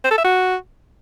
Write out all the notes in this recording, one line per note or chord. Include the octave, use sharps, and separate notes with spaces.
C5
A4
E5
F#4